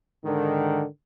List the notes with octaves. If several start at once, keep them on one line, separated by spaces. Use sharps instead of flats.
G#2 D3 D#3